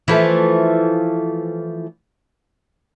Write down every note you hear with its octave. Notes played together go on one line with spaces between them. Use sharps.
E3 F3 A3